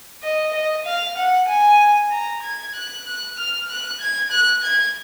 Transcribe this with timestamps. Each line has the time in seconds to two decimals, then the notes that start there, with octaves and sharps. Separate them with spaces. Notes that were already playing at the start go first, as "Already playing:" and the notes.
0.23 D#5
0.54 D#5
0.85 F5
1.17 F#5
1.48 G#5
2.11 A#5
2.42 G#6
2.75 F#6
3.06 F#6
3.38 F6
3.69 F#6
4.01 G#6
4.31 F#6
4.64 G#6